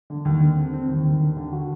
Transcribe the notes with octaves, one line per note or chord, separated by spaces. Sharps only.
D3
D#2
D3
C4
C4
D#2
D#2
D3
D3
F#4